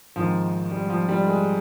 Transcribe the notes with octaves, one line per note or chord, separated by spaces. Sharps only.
G#1 G#2 D#3 F3
G3
F3
G3
G#3